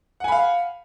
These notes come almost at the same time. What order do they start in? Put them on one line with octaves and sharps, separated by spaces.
F#5 G#5 B5 F5